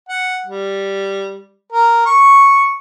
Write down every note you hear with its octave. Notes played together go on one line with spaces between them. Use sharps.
F#5
G3
A#4
C#6